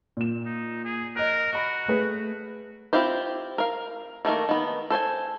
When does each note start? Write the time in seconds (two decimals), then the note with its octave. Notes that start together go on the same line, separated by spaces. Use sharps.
0.17 A#2 E7
0.46 D#4
0.85 G#4
1.16 A#4 D#5 F#6
1.53 F#4 D#5 B5
1.88 A3 G#4 B4
2.93 C4 E4 F4 G4 C5
3.58 A#4 F5
4.25 D#3 A3 A#3 A#4
4.49 D#3 B3
4.90 A4 C5 C#5 G#5